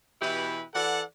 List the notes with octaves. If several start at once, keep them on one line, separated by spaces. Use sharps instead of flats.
B2 E3 E4 G4 B4
E3 A4 D5 F#5